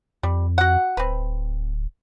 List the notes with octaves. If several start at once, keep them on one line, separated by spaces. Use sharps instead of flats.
F2 G3
F#4 F#5
D1 C4 B4